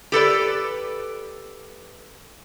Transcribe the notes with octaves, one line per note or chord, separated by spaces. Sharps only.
G4 A4 B4 D5